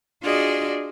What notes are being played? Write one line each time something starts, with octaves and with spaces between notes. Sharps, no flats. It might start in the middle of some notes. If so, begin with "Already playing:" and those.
D4 F4 F#4 G#4 D5 D#5